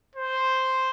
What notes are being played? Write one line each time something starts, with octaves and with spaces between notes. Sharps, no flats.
C5